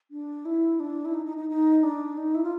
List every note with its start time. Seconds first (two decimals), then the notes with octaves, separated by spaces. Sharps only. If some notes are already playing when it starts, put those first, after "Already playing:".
0.11 D4
0.45 E4
0.79 D4
1.05 E4
1.14 D#4
1.25 D#4
1.36 D#4
1.49 D#4
1.83 D4
2.17 D#4
2.34 E4
2.43 F4